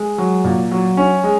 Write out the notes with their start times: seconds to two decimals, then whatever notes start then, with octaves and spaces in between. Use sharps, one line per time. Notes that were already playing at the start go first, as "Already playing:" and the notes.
Already playing: G#3
0.18 F#3
0.44 A#2
0.71 F#3
0.97 C#4
1.24 G#3